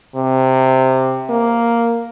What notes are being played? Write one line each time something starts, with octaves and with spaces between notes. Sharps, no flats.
C3
A#3